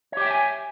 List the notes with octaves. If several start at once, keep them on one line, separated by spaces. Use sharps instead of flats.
G4 C#5 E5 G5 G#5